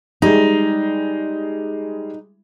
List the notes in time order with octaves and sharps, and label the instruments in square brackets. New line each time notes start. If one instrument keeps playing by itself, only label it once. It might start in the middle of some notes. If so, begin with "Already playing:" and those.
[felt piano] G3 G#3 [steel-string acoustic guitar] D#4